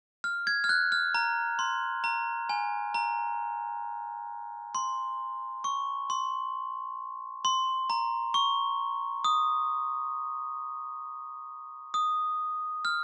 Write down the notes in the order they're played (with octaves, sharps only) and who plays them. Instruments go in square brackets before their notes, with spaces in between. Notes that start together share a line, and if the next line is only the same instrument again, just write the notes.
[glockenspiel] F6
G#6
F6
F#6
F6
A#5
C6
A#5
G#5
A#5
C6
C#6
C6
C6
A#5
C#6
D#6
D#6
F6